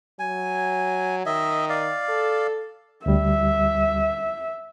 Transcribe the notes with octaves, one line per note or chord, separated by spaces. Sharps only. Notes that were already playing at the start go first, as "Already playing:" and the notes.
F#3 G#5
D#3 D#5 E5
D5 F5
A4
D2 G3 E5